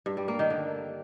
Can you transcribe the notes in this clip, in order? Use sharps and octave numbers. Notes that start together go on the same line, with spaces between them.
G2
G3
A#3
D#3
D3